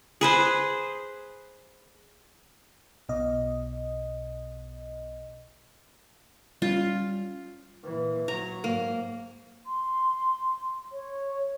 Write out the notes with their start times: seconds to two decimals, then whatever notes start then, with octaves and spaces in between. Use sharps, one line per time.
0.21 G#4 B4 C5
3.09 B1 B2 D#5
6.62 G3 B3 C#4 F4
7.83 A#2 E3
8.28 F#3 A#5
8.64 G#2 A#3
9.67 C6
10.92 C#5